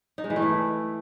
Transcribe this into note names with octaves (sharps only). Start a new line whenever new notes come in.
D#4
G#3
E3
A3
E4